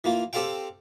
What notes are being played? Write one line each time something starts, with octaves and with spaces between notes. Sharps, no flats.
E3 A#3 F4
C4 G4 A4 C5 F5 G5